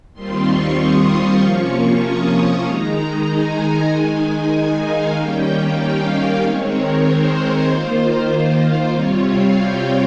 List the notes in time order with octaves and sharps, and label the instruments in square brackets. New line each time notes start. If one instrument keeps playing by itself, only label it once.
[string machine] D#2 D#3 G3 C4 F4 C6
C#6
D#6
C3 F3 A#3 C#4 F4 C#6
D#6
C#6
D#3 G#3 D#4 A#5
G#5
D#3 G#3 D#4
G#5
F5
D#3 G3 A#3 C#4 G5
F5
D#3 G#3 C4 C#5
A#4
C5
D#3 A#3 F4
C5
C3 G3 C4 F4 C#5
F5
G5